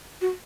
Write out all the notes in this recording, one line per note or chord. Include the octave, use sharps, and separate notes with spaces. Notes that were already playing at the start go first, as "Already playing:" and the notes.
F#4